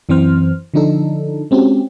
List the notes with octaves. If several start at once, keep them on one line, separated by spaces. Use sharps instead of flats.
F#2 E3 C4 C5 F6
D3 F3 D4 D#4 A4
G#3 C4 C#4 F#4 G4